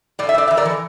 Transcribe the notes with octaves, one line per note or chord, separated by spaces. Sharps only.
A2 D5
E5
A2 D5
E3 E5
A#4 D5
E3